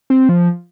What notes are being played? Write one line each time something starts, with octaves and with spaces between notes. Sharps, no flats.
C4
F3